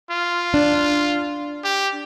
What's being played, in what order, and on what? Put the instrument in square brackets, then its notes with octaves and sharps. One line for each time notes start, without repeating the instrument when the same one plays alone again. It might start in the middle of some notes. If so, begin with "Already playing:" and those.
[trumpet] F4
[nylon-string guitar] D4
[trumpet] G4